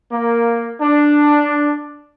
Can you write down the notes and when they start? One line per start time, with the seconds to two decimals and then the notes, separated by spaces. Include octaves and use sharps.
0.11 A#3
0.81 D4